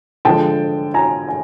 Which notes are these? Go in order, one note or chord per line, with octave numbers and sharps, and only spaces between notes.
D3 F3 G#3 G5 A5
G#5 A#5
G#5